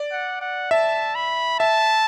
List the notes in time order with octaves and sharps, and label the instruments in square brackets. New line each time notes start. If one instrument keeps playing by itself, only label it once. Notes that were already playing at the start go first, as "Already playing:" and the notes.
Already playing: [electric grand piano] D5
[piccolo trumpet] F#5
F#5
[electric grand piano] E5 [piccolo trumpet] A5
[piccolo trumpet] B5
[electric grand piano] E5 [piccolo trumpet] A5